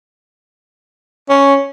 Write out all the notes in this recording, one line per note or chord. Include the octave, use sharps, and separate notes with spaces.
C#4